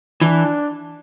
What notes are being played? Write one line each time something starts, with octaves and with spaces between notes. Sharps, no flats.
E3 D4